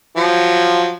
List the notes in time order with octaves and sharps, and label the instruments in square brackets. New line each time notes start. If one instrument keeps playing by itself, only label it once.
[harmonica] F3 F#3